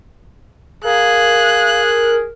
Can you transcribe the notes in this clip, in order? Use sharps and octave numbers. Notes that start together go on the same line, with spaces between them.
G#4 A#4 F5 F#6